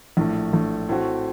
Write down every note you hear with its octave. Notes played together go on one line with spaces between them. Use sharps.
A#1 A2 A3
A#1 A2 A3
A2 A3 C4 F#4